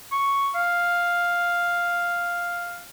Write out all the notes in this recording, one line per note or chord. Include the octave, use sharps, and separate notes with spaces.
C#6
F5